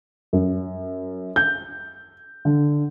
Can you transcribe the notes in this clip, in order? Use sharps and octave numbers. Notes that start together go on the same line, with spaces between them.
F#2
G6
D3